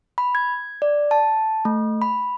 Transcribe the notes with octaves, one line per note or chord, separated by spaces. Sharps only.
B5
G#6
D5
A5
A3
B5